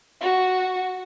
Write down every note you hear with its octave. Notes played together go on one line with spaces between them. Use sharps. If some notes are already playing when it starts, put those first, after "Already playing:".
F#4